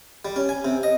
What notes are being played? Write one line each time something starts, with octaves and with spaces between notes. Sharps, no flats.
G3
C#4
G#5
C3
D#5